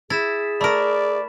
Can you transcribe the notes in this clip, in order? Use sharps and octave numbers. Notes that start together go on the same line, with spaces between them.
E4 G#4 A6 B6 E7
A3 A#4 D5 B5